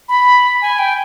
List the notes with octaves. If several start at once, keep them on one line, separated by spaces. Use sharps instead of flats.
B5
G#5
G5